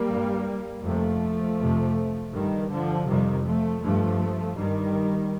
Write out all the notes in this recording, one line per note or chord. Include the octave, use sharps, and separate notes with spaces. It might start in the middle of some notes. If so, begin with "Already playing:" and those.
Already playing: G3 A#3
G2
F2 C3 F3 A3
F2 C3
G2 D#3 G3
D3 F3
F2 C3 D#3 G3
F3 A3
G2 F3 A3
G2 D#3 G3